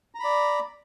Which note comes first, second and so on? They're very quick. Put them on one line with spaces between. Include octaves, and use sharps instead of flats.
A#5 B5 D5